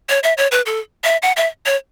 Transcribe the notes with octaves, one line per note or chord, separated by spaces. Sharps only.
C#5
E5
C#5
B4
A4
E5
F#5
E5
C#5